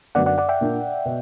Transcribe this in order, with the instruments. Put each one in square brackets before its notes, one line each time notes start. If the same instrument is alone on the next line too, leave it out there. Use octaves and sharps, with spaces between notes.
[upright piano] F#2 D3 F#3 B3 D4 [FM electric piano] D5 F#5
[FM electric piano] D5 F#5
D5 F#5
E5 G5
[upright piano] A#2 A#3 D4
B2